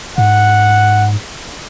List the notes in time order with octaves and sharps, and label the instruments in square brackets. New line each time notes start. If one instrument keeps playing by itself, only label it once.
[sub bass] G#2 [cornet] F#5